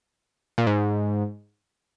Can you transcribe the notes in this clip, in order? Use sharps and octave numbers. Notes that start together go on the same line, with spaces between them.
A#2
G#2